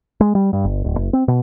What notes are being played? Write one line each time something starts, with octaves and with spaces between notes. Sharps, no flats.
G#3
G3
G2
G1
D1
F#1
C4
B2